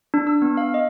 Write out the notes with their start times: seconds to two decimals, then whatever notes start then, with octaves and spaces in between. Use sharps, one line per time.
0.14 D4
0.27 E6
0.42 B3
0.57 F5
0.74 D#5